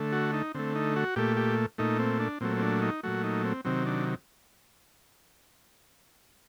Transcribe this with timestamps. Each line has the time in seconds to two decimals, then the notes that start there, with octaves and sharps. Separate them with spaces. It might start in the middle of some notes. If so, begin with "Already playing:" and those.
Already playing: D3 A3
0.12 F#4
0.33 D#4
0.54 D3 A3 C4
0.75 D#4
0.96 F#4
1.16 A#2 A3 G4
1.37 G4
1.78 A#2 A3 D#4
1.99 C4
2.20 D4
2.41 A#2 F#3 A3 C4
2.57 C4
2.62 D4
2.82 D#4
3.03 A#2 F#3 A3 F#4
3.24 D#4
3.44 C4
3.65 C3 D#3 F#3 C4
3.86 D4